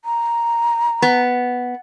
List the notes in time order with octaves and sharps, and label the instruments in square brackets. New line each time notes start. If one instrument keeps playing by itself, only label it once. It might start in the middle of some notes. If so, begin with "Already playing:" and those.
[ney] A#5
[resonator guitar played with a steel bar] B3